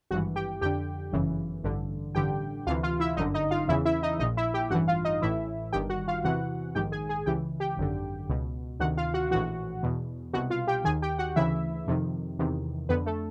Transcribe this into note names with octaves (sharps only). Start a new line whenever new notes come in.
G#1 G2 E3 F#4 F#5
G4 G5
F2 D3 G4 G5
G1 F#2 C#3 E3
A1 G2 D3
A1 G2 D3 G4 G5
D2 C3 E3 F4 F5
F4 F5
E4 E5
G1 F#2 D3 D#4 D#5
D#4 D#5
F4 F5
E2 C#3 E3 E4 E5
E4 E5
D#4 D#5
A#1 A#2 D#4 D#5
E4 E5
G4 G5
A1 G2 E3 F#4 F#5
F4 F5
D#4 D#5
A1 A2 E3 E4 E5
G1 G2 D#3 G4 G5
F#4 F#5
F4 F5
E2 C3 E3 F#4 F#5
A#1 G#2 D#3 G4 G5
G#4 G#5
G#4 G#5
C#2 C#3 E3 G4 G5
G4 G5
G#1 F#2 D3
C#2 B2
D2 C3 D#3 F#4 F#5
F4 F5
F#4 F#5
A#1 A2 E3 F#4 F#5
E2 B2
C2 B2 F#4 F#5
F4 F5
G4 G5
D#2 D#3 G#4 G#5
G4 G5
F#4 F#5
D2 C#3 E3 E4 E5
F2 C3 D#3
E2 C3 D#3
F2 D3 B3 B4
A3 A4